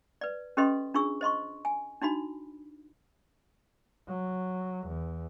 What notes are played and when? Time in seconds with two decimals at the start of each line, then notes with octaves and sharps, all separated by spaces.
0.21 B4 D5
0.57 C#4 G4 A4 B4 D#5 C6
0.94 D4 F4 G#4 C#6 E6
1.21 C5 D#5 C6 C#6
1.65 G#5
2.02 D4 D#4 F#4 B5
4.08 F#3
4.88 E2